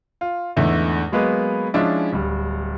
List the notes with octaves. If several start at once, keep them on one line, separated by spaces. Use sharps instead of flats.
F4
E2 G#2 D3 A3 E4
F#3 G#3 A#3 B3 B4
F3 G#3 C#4 D4 E4
D1 G3